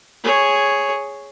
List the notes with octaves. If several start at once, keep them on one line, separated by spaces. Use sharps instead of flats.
G#4 C#5